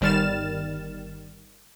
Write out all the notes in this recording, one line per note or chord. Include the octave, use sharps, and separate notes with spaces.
G1 D#3 G3 F6 A6 E7